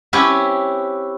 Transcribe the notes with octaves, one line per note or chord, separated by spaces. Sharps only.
C4 C#4 E4 G4 B4